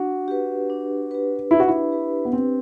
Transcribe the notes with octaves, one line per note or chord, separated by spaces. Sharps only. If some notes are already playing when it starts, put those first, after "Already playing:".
Already playing: D4 F#4
G4 B4
D4
G4 B4
D4 E4
F#4
E4
G4 B4
B3
C4 D4